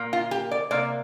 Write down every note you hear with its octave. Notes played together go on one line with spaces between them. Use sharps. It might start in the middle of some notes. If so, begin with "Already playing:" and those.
Already playing: A#2 A#3
F4
G4
D5
C3 A#3 D5